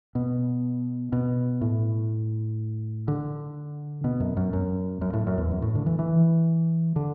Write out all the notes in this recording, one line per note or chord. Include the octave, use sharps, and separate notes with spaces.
B2
B2
A2
D3
B2
F#2
F#2
F#2
F#2
A2
F#2
E2
F#2
A2
D3
E3
E3
D3